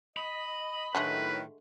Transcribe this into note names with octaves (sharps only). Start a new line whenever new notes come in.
D#5 B5
A2 D3 D#3 F#3 G#3 A3 B4